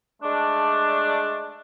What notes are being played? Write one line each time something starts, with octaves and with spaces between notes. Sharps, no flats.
G#3 A3 D4